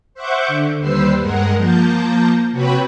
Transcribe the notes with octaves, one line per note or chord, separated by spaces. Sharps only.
C5 E5 F#5 C#6 D6 G6
D3
D#2 G3 B4 C5 E6 C7
G2 G#3 A#4 F#5
F3 A#3 A5 A#5 G6
C3 F#4 B4 C#5 G5 B5